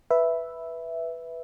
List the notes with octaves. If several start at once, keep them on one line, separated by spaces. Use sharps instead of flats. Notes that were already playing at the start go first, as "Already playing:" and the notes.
B4 E5